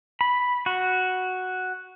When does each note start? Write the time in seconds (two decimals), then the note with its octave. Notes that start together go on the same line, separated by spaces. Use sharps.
0.21 B5
0.66 F#4